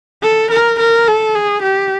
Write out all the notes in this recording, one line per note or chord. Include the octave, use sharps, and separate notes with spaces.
A4
A#4
A#4
A4
G#4
G4